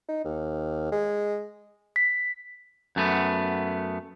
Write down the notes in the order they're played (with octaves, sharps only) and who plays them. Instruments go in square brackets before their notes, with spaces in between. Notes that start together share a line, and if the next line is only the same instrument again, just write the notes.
[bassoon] D#4
D#2
G#3
[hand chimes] B6
[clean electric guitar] F#2 A3 B3